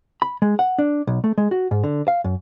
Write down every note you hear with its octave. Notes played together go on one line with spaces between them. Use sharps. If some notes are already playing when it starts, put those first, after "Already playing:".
B5
G#3
F#5
D4
B1
A3
G#3
F#4
G#2
D3
F5
F#2